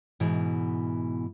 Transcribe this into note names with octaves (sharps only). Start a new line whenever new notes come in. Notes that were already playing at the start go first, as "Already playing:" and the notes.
G#2 B2 E3